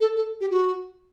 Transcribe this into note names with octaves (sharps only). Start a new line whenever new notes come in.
A4
A4
G4
F#4